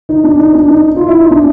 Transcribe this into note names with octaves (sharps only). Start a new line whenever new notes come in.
D#4
D4
D#4
D4
D#4
F4
E4
D#4
D4